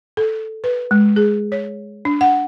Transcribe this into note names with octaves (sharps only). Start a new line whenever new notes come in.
A4
B4
G#3
G#4
C#5
D4
F#5